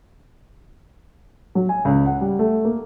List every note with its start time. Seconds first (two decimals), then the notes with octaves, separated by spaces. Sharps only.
1.55 F#3
1.69 G#5
1.85 C#2
2.06 F#5
2.21 G3
2.39 A3
2.65 A#3